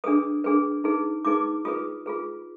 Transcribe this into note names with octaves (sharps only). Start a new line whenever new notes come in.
D4 G#4 B4 D#6
D4 G#4 B4
D#4 G#4 B4
D#4 G#4 B4 D6
F4 G#4 B4 D#6
F4 G#4 B4